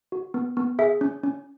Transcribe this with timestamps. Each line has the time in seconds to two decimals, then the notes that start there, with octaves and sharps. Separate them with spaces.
0.12 F#4
0.34 B3
0.57 B3
0.79 G#4 E5
1.01 C#4
1.24 C#4